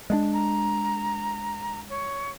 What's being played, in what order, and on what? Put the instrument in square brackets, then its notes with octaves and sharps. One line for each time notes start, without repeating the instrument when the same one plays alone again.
[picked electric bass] G#3 A3 D4
[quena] A#5
C#5